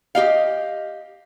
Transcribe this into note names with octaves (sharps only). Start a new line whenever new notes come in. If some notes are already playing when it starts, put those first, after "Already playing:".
G4 D#5 F5